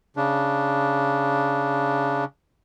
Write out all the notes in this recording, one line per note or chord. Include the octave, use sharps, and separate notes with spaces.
C#3 D4